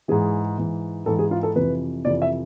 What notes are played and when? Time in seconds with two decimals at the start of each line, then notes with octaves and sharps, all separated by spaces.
0.08 G#2 E3 G#4
0.58 G#2 E3
1.06 G#2 E3 A4
1.19 G#4
1.31 F4
1.43 A4
1.56 F2 C3 E3 B4
2.05 F2 C3 E3 D5
2.22 E5